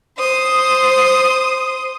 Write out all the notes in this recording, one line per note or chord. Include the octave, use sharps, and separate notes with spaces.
C5 D#6